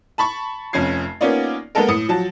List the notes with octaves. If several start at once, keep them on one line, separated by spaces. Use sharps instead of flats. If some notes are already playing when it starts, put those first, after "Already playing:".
A5 B5 C#6
F1 F2 C#4 G#6 C7
A#3 B3 C#4 D#4 F4 D5
G#3 A#3 B3 A4 A#4
A2 D#6 C#7
F3 F#3 A5